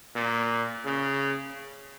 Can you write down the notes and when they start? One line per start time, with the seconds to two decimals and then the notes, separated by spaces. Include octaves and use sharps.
0.16 A#2
0.86 C#3